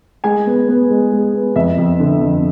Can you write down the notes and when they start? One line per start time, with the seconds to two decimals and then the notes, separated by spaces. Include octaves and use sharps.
0.24 G#3 G#5
0.47 B3
0.69 B3
0.90 G#3
1.12 G#3
1.34 B3
1.55 F2 E5
1.78 F2
2.00 D3
2.21 F2